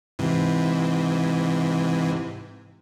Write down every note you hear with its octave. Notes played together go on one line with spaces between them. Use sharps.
G#2 C3 E3